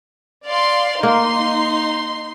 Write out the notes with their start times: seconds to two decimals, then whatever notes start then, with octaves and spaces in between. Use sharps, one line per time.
0.46 D5 F5 C6
1.03 A#3 D#4 C6